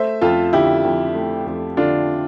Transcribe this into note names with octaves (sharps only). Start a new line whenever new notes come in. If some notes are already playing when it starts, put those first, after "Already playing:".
Already playing: A3 C5 E5
F2 F4 A4
D3 E4 G4
F2
A3
F2
D3 D4 F4